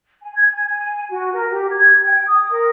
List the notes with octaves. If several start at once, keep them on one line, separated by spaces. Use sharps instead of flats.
G#5
G#6
G#5
G#5
F#4
A#4
G4
G#6
G5
D#6
A#4